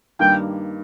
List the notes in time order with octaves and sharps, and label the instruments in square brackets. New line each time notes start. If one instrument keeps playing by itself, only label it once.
[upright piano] G2 D#3 G3 A#3 [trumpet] G5